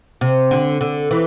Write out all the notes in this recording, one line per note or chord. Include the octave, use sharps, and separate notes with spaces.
C3
D3
D3
E3